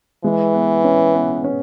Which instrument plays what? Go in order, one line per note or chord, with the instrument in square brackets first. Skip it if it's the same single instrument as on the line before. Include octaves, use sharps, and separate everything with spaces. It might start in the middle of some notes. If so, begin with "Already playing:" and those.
[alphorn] E3 [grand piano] G#3
[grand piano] B3
C#4
B3
C#4